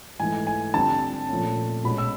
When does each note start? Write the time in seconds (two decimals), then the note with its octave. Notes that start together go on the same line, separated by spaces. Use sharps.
0.20 G#2 E3 A3 G#5
0.47 G#5
0.74 D3 G3 C4 A5
1.29 A#2 F3 A3 C#4
1.84 B2 G#3 C#4 B5
1.98 E6